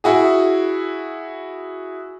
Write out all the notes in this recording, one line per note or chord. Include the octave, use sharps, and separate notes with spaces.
E4 F#4 G#4